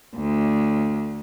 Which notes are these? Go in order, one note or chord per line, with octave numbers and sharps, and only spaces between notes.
D2